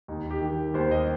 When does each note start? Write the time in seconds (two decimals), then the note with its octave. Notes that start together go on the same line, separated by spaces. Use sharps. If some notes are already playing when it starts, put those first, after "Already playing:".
0.08 D#2 D#4
0.31 G4
0.42 D#3
0.74 D#2 C5
0.91 D#5